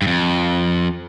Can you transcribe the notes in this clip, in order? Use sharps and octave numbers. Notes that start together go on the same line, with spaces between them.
G2
F2